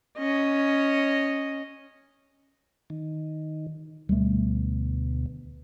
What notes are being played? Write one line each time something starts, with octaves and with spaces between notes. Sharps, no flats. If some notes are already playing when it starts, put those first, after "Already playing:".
C#4 D#5
D#3
D2 B2 G3 A3